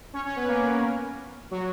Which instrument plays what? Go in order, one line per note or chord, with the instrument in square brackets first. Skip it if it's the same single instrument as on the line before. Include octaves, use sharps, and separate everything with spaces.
[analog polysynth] C#4 C#5
C#4 C#5
B3 B4
A#3 A#4
F#3 F#4